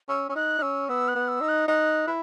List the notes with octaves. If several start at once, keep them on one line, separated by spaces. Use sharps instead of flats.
C#4 E6
C#4 E6
D#4 F#6
D#4
C#4 E6
B3 E6
F#6
B3
E6
D#4
F#6
D#4 F#6
E4